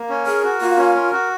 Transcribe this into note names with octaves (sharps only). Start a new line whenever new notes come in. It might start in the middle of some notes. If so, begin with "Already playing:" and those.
Already playing: A#3
C#4
G#4 A#4
F#4
A#3 F4
C#4
A#4
F#4